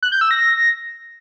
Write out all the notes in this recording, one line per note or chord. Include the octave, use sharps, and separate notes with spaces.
F#6
G6
E6
A#6